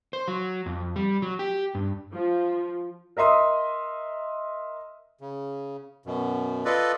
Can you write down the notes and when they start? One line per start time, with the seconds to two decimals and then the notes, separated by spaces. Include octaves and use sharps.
0.13 C5
0.28 F#3
0.66 F2
0.96 G3
1.22 F#3
1.39 G4
1.75 G2
2.13 F3
3.17 A#4 D#5 E5 C6 D#6
5.21 C#3
6.06 F#2 B2
6.65 F4 A4 B4 D5 D#5